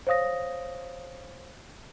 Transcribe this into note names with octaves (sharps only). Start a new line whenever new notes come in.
C5 C#5 F5 D#6 A#6